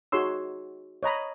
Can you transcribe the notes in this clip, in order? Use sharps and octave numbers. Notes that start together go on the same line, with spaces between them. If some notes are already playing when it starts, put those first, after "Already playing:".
D#4 F#4 G#4 C#5 C6 E6
C#5 D#5 A#5 B5